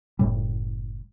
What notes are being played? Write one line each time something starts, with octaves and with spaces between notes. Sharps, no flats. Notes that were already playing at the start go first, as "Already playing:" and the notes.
F#1 B1 A2 G3